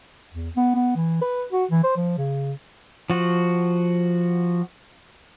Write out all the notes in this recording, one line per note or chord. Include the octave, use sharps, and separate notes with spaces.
E2
B3
B3
E3
B4
F#4
E3
C5
F3
C#3
F3 F#4